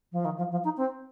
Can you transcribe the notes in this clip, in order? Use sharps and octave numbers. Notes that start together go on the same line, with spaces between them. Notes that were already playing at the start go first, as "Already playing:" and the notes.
F3
D#3
F3
F3
D#4
C4